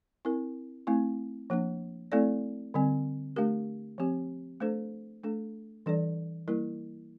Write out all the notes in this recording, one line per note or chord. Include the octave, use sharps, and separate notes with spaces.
C4 E4 A#4
A3 C4 E4
F3 A#3 D4
A3 C4 E4 A4 D5
D3 G3 C4
A3 D4 G4 A#4
F3 C4 G4
A3 D4 A4 C5
A3 D4 A4
E3 G3 D4 A4 D5
G3 A#3 E4 A#4